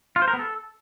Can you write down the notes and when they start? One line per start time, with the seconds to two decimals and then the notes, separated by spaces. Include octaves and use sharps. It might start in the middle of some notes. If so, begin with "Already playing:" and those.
0.16 F4
0.22 C5
0.28 A#4
0.33 B3
0.39 A4